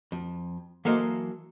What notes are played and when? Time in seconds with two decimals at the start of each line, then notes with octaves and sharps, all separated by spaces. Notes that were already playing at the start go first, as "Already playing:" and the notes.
0.12 F2
0.85 E3 F#3 A#3 A4 C5 D#5